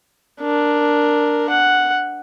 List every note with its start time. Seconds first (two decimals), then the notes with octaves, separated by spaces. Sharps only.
0.42 D4 A#4
1.50 F#5